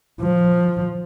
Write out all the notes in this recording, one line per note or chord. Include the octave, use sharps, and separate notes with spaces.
F3